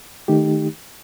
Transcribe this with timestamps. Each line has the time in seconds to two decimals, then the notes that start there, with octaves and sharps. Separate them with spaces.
0.28 D#3 A3 D#4 G4